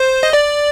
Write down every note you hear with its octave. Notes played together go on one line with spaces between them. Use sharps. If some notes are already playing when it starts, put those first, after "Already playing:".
Already playing: C5
D#5
D5